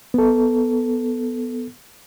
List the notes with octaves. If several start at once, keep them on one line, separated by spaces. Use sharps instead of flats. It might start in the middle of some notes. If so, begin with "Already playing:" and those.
B3 A4